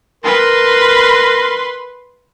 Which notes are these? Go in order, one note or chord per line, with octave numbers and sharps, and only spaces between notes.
A#4 B4 C6